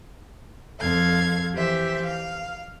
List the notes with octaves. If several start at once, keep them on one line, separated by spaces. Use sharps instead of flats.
F2 A4 F5 G#6
E3 G4 C5 E5
F5